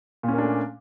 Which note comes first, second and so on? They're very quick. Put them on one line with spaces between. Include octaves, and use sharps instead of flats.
A#2 C#4 A#3 D4 A3